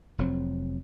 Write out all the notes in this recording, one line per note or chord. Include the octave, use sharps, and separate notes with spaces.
F1 F2 F#3 C4